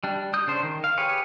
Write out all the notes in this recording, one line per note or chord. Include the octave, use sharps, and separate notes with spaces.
G3 D4
G3 D#6 G6
C#3 D4 C5
D#3
F5
G4 G#4 B4 C#5